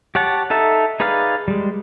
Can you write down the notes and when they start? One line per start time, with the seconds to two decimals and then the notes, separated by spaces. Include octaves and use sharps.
0.15 G4 C#5 F#5 A5
0.50 D#4 A4 E5
1.00 D#4 G#4 B4 D5 F5
1.48 G3 G#3